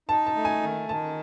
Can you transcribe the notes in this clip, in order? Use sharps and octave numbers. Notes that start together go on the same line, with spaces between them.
D#4 A5
A5
A3
G#5
D#3
D#3 A5